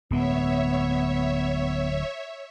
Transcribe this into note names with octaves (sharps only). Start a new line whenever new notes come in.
D1 G#3 B3 C#5 E5